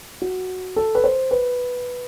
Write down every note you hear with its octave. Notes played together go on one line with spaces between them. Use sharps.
F#4
A4
B4
C5
B4